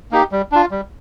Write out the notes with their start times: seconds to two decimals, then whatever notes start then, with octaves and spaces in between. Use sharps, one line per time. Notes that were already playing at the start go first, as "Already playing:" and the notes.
0.12 A#3 D#4 G4
0.32 G3
0.52 D4 F4
0.71 G3